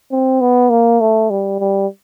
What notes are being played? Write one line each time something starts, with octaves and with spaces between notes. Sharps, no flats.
C4
B3
A#3
A3
G3
G3